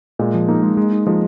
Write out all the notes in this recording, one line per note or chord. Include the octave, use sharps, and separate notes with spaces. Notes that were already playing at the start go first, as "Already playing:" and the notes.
A#2 G#3
F3
A#3 D#4
G#3
G#3
D#4
F3 G#3